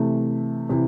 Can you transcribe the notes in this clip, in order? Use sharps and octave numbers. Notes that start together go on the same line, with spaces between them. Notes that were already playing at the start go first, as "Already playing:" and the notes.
Already playing: C3 E3 A3
C3 E3